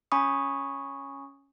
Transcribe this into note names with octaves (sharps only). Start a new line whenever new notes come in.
C#4 G#5 B5 C#6 D#6